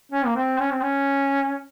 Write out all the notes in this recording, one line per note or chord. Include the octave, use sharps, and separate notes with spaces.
C#4
A#3
C4
C#4
C4
C#4